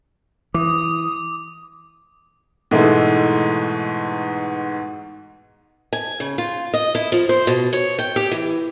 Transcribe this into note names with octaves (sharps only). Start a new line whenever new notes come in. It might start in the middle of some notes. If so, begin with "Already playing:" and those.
E3 D6 D#6
G#2 B2 E3 G#3 A3
G#5
C#3
F4
D#5
E4
F3
C5
B2
C#5
G5
G4
E3